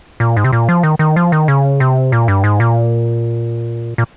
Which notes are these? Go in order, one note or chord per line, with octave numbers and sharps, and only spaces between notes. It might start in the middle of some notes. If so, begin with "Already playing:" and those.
A#2
G#2
C3
A#2
F3
D#3
D#3
F3
D#3
C#3
C3
A#2
G2
G#2
A#2
A#2